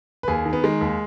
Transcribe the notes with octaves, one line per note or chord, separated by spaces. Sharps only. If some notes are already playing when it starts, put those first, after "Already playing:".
B4
D#2 G#4
D#3
B3
D#3 G#3
D#2